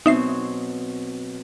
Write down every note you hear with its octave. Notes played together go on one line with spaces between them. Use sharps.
B2 F#3 C4 D#4 E5 C7